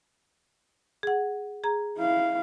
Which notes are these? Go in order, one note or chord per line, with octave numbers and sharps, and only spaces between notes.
G#4 F#5
G#4 A#5
E4 F5